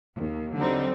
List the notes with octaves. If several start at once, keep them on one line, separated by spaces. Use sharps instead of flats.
D#2
D3 F#3 G3 C4 D#4